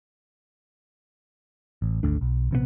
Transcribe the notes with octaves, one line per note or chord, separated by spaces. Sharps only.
A1
G#1 D2 A3 D4
B1
A#1 C3 D#3 B3